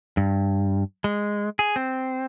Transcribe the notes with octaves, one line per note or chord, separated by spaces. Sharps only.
G2
G#3
G#4
C4